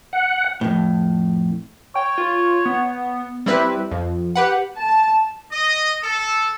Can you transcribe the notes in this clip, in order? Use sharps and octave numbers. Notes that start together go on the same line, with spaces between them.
F#5
F2 A2
C#5 G5
F4
B3
G3 C4 E4 B4
F2
G4 B4 F#5
A5
D#5
A4